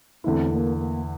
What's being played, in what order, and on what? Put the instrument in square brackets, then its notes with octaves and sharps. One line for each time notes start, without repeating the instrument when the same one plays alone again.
[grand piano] E2 D3 A3 E4 [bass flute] C4
[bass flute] A#3
A#3